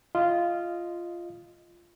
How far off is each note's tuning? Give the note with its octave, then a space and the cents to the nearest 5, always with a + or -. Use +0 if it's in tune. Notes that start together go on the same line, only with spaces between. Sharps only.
F4 -10 D#5 +0